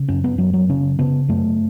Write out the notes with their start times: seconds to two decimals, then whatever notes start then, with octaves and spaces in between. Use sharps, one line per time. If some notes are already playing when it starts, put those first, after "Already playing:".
Already playing: C#3
0.08 F#2 C#4
0.24 B3
0.38 F#2 F#3
0.53 F#3
0.69 C#3 C#4
0.99 C#3 B3
1.29 F#2 A3